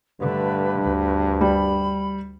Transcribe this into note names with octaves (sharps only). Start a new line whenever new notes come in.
G2 D3 A3 B4
D2
G3 B5